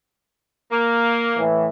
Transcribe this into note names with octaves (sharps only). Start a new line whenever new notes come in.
A#3
A2 E3